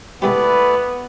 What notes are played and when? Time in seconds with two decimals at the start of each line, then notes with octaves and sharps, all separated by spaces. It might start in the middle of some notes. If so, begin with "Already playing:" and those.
0.22 D#3 G#3 A3 B3 E4 G4 B4 D5